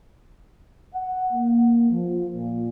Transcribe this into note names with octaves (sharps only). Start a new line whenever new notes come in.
F#5
A#3
F3
A#2